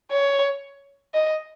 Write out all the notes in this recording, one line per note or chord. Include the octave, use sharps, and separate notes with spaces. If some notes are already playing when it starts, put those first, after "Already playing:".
C#5
D#5